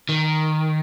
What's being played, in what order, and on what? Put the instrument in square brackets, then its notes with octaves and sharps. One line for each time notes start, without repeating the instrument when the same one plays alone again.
[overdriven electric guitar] D#3